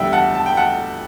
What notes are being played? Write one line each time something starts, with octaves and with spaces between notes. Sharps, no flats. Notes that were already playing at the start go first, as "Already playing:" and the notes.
Already playing: E2 D3 G3 E5 G5
F#5 A5
A5
G5
F#5 A5